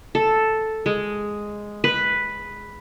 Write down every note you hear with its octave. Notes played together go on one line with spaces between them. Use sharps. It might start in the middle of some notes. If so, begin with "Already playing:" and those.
A4
G#3
B4